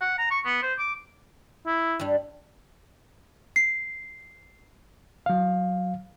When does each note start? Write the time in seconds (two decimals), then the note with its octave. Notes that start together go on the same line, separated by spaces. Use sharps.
0.01 F#5
0.18 A#5
0.30 C#6
0.46 B3
0.62 C5
0.79 D6
1.67 E4
2.00 G2 G3
3.56 C7
5.26 F#3 F5